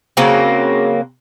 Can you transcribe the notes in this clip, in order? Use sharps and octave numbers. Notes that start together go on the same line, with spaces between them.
C#3 F#3 A#3 C4